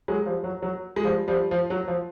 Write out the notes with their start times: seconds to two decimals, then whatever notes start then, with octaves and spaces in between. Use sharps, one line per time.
0.08 F#3 G#3
0.26 F3 G3
0.44 F#3
0.62 F#3
0.96 G#3
1.04 F3 G3
1.28 F3 G3
1.51 F3
1.70 F#3
1.88 F3